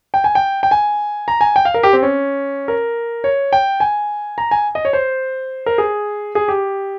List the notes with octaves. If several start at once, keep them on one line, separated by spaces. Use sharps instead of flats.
G5
G#5
G5
G5
G#5
A#5
G#5
G5
F5
A#4
G4
C4
C#4
A#4
C#5
G5
G#5
A#5
G#5
D#5
C#5
C5
A#4
G#4
G#4
G4